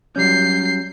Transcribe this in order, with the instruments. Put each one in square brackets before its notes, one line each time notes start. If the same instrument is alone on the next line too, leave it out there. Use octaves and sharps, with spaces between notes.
[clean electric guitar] F#3 G3 C#4 [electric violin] G6 C7